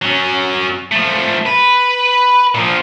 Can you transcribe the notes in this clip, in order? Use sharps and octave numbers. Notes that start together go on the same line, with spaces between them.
F#3 C#4
F3 A3
B4
A#2 F3